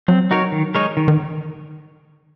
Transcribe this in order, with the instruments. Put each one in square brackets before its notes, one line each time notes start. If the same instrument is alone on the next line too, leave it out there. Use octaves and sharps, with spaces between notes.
[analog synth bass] F#3 [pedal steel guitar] C4
[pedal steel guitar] D#4 F#4 A#4 C#5
D#3
G#3 D#4 A#4 C#5
D#3
[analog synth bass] D#3